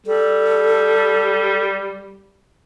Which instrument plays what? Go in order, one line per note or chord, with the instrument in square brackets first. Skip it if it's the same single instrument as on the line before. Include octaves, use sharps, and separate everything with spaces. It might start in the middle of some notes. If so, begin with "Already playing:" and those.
[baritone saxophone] G3 [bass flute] A4